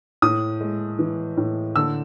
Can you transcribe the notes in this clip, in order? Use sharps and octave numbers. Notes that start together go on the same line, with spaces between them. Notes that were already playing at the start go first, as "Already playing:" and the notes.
A2 D#6
G#3
E3
A2
D3 E6